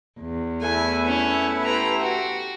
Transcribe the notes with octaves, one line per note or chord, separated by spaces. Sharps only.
E2
A3 B3 E4 G#5
C#4
G4 A4 B4 C5 A#5
F#4